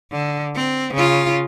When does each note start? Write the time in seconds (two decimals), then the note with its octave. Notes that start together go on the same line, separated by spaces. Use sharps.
0.12 D3
0.55 C4
0.94 C#3 F4